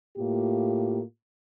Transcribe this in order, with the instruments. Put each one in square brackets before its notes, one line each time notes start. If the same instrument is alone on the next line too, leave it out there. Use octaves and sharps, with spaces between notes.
[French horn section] A2 A#3 F4 G4